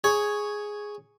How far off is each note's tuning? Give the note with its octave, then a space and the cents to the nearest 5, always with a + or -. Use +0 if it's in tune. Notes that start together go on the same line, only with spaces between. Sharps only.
G#4 +0 C#5 +0